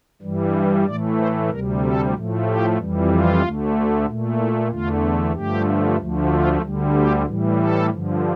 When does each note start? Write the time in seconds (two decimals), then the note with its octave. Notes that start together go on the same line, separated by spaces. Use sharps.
0.22 G2 E3 G3
0.86 A2 E3 A3 D5
1.18 C5
1.50 D2 C3 G3 A#4
1.82 A4
2.14 A2 F3 A3
2.47 G4
2.78 F2 E3 G3
3.10 F4
3.41 D2 D3 A3
4.06 A#2 A3
4.39 E4
4.70 E2 D3 A3 F4
5.34 G2 D3 F3 A3 G4
5.98 D2 D3 F3 A3
6.30 F4
6.62 D2 D3 G3
6.93 G4
7.26 A2 E3 G3
7.58 A4
7.91 G2 D3 F3